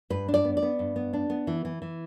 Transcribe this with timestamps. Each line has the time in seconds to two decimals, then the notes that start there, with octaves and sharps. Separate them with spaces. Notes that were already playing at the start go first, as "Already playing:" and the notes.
0.10 G2 B4
0.28 D4
0.34 D5
0.45 B3
0.57 D5
0.63 B3
0.79 G2
0.96 B3
1.13 D4
1.30 B3
1.47 E3
1.65 E3
1.82 E3